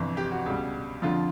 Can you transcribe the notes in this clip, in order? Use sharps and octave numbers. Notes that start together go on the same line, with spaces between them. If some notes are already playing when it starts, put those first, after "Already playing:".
Already playing: G1 F2 C3 E3
G4
F#4
C#2 B2 G3
F2 D3 F3 F4